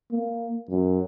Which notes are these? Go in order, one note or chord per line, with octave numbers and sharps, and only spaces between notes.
A#3
F#2